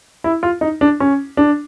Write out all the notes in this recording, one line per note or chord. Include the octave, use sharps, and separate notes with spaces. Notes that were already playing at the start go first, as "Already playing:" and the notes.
E4
F4
D#4
D4
C#4
D4